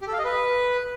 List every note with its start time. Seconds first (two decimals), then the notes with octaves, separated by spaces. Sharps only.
0.01 G4
0.07 A4
0.13 F5
0.19 D#5
0.24 B4